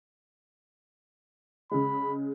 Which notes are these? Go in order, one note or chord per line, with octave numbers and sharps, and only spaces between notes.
C#3 G#3 B5